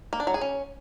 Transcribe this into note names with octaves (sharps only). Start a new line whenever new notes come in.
A#3
D4
F#3
G#4
C#4